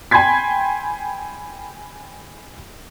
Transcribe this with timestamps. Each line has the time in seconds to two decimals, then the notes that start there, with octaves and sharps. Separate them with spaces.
0.11 G5 G#5 B5 C6 G#6 B6